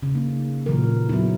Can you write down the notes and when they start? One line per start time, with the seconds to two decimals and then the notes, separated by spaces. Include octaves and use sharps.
0.03 C#3
0.15 A#3 D#4
0.66 A#2 C#3 E3 F#3 A#4
1.09 F#3 B3 D#4 E4